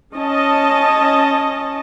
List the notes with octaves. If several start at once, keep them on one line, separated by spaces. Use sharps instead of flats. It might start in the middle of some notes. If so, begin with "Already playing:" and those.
C#4 D#5 A5